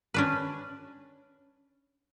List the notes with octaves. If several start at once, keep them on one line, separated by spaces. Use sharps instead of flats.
C#4 D4 B4